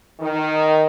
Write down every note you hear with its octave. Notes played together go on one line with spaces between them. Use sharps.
D#3